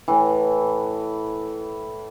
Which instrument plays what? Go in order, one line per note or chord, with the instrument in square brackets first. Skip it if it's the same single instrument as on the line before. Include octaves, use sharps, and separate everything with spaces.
[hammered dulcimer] A2 E3